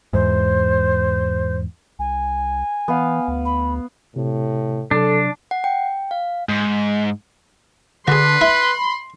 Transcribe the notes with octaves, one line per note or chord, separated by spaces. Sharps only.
E2 G#2 C5
C2 G#5
E3 B3 F5
D2
B5
A2 C3
C3 F#3 D4 A4
F#5
G5
F5
G#2
D3 F#4 G#4 B4 C6
E4 B5